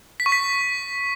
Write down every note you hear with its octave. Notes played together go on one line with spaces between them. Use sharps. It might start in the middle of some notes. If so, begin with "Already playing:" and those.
B6
C#6
B6